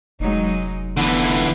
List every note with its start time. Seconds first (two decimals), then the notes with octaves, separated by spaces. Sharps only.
0.20 F1 F#3 G#3 D#4
0.97 D3 E3 B3